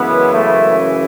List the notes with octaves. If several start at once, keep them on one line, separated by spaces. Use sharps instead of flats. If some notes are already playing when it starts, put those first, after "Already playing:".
Already playing: F#2 C#3 E3 G#3 B3
A3